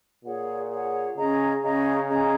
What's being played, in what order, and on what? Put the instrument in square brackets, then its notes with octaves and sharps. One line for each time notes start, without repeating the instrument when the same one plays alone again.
[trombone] A#2 [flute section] G#4 C#5 F#5
[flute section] G#4 C#5 F#5
[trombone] C#3 [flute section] C#4 G#4 D#5 A#5
[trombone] C#3 [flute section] C#4 G#4 D#5 A#5
[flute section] C#4 G#4 D#5 A#5